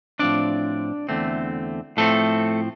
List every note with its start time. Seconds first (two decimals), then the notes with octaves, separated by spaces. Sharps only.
0.19 A2 F3 C4 D4 D5
1.09 E2 D3 A3 C4
1.97 A2 F3 A3 C4 A4